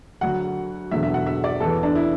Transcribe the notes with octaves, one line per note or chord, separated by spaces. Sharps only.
D2 D3 F#3 F#5
E1 E2 D3 F#3 E5
E5
F#5
E5
D5
E2 E3 A4
D4
E4